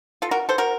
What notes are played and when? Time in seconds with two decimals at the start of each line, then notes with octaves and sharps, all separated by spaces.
0.22 F4 A4
0.31 F#4 A#4
0.49 A4 C5
0.58 F#4 A#4